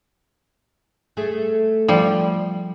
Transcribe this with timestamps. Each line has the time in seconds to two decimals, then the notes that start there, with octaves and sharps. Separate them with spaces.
1.17 A3 G#4
1.88 F3 G3